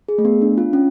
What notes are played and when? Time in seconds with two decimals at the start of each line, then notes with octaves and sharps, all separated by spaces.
0.09 G#4
0.18 A3
0.25 B3
0.42 D4
0.58 F4
0.73 C#4